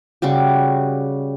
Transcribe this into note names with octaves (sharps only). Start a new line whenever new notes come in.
C#3 G3 F#4 G4